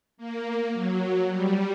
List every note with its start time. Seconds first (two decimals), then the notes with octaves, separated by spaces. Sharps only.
0.17 A#3
0.73 F#3
1.29 G3